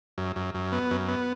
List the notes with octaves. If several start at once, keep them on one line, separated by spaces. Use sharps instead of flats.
F#2
F#2
F#2
B3
F#2
B3